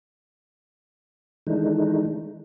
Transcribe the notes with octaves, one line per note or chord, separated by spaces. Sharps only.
D#3 E3 G#3 A3 D4 D#4